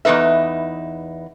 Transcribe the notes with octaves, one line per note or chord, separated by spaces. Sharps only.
E2 G2 D#4 B4 E5